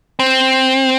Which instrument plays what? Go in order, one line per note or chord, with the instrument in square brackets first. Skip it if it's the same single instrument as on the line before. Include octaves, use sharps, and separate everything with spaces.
[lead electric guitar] C4